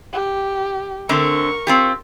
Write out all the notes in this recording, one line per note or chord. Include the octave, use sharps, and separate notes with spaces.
G4
D3 A3 C4 A#4 C#6
C4 F4 G4